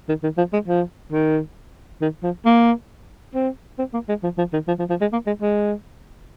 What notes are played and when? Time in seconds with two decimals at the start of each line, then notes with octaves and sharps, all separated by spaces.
0.09 D#3
0.23 D#3
0.38 F3
0.53 G#3
0.68 F3
1.12 D#3
2.01 D#3
2.23 F3
2.45 A#3
3.34 C4
3.79 C4
3.93 A#3
4.09 G#3
4.23 F3
4.38 F3
4.53 D#3
4.68 F3
4.79 F3
4.90 F3
5.01 G#3
5.13 A#3
5.27 G#3
5.41 G#3